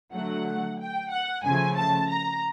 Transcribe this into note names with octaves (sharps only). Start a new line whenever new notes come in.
D3 F#3 A3 F#5
G5
F#5
C#3 F3 A3 G#5
A5
A#5